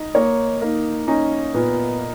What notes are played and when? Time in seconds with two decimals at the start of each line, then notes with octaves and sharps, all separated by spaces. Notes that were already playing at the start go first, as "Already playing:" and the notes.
Already playing: D#4
0.15 A#3 C#5
0.61 A#3 D#4
1.08 C#4 D#4
1.54 A#2 B3